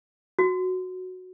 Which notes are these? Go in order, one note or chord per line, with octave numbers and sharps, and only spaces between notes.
F#4